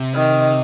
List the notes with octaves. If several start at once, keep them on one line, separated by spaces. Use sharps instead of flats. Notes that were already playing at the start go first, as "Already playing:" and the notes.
Already playing: C3
D#3